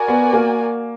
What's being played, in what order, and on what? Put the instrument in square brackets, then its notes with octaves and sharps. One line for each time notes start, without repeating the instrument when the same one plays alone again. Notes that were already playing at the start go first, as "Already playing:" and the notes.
Already playing: [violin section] F#4 A#4 D5 G#5
[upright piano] B3
A#3